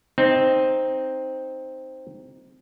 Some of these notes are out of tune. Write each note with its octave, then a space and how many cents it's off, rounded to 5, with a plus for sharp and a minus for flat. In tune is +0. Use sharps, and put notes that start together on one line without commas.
C4 +0 D#4 +0